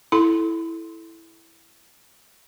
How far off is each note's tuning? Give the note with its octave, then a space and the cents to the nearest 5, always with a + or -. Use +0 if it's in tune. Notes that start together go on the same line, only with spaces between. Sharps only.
E4 +0 A4 -10 C6 +0